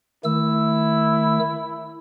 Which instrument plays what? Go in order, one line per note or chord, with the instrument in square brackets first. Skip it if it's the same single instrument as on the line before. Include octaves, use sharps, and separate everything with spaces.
[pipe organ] D#3 A3 E6 [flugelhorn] E4